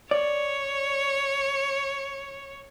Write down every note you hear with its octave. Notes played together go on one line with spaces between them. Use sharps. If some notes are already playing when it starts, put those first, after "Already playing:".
C#5 D5